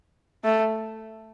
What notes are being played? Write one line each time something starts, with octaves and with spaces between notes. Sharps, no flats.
A3